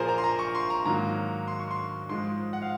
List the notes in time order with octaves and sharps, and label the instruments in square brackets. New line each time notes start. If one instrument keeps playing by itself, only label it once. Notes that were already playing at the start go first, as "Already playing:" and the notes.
Already playing: [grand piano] A#2 F3 A#3 G#4 A#4 C5
A#5
C6
A#5
C#6
C6
A#5
G#2 D#3 F#3 A#3 A#5
C6
C#6
C6
G#2 F3 G#3 C6
F#5
F5